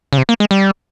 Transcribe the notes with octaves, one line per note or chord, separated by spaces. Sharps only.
C#3
C3
A#3
G#3
G3